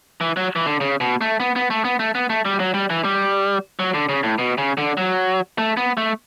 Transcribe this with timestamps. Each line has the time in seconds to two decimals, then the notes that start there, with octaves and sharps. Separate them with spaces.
0.21 E3
0.37 F#3
0.56 E3
0.66 D3
0.81 C#3
1.01 B2
1.21 A3
1.40 B3
1.56 B3
1.70 A3
1.85 B3
1.99 A3
2.15 B3
2.30 A3
2.45 G3
2.60 F#3
2.74 G3
2.90 E3
3.05 G3
3.79 F#3
3.94 D3
4.09 C#3
4.23 A2
4.38 B2
4.58 C#3
4.78 D3
4.97 F#3
5.58 A3
5.77 B3
5.97 A3